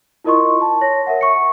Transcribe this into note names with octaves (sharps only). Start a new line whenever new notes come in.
E4 F4 A#4 D#5 C6 C#6
A5
C#5 A#6
A#4 E5 F#5
C#6 C#7